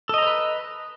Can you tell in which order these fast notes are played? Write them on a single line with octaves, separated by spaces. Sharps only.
A4 D#5 A#5 C5 B4